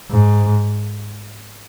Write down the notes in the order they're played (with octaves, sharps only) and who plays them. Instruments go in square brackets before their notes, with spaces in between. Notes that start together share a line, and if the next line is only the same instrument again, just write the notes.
[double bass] G#2